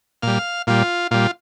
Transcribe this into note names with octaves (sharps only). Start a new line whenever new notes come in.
A#2 G3 F5
A#2 G3 F4
A#2 G3 F4